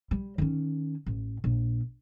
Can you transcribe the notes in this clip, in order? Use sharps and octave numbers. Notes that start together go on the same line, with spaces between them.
G3
D#3 C#4
A1
A#1